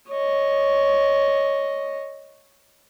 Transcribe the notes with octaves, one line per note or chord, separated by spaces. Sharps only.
C#5 D#5